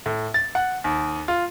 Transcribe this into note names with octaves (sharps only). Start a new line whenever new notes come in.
A2
A6
F#5
D#2
F4